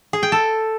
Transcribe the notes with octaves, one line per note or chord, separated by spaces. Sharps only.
G#4
G5
A4